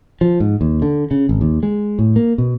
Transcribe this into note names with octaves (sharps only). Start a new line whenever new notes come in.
F3
G#2
D#2
D3
C#3
G#1
D#2
G#3
A2
A#3
B2